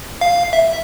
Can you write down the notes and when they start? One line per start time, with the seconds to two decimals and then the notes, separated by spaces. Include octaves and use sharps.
0.21 F5
0.53 E5